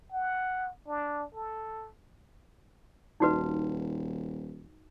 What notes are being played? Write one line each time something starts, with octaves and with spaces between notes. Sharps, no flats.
F#5
D4
A4
D#1 D#4 F#4 B4